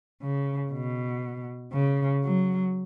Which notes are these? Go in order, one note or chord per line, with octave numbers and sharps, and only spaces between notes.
C#3
B2
C#3
F#3